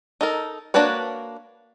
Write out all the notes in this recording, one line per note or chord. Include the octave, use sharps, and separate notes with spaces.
D#4 A4 A#4
A#3 D4 F#4 B4 C#5